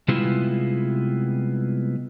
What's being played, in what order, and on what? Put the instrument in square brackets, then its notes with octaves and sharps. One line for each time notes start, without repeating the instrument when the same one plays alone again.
[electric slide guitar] C3 G3 G#3 B3 E4 F4